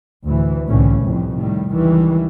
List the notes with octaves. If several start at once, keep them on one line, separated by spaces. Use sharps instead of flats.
D2 A2 E3
C2 A2 D3 E3 A3 C#4
C2 F2 A2 C3
A2 D#3 G3
C#2 D#3 E3 G3